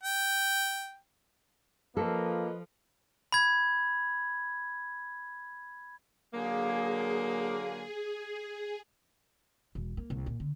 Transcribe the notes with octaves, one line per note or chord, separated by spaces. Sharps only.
G5
F3 A#3 F4 A4 B4 D#5
B5 G#6
D3 F#3 A#3 G#4
E1
A#3
C2
A#2
D3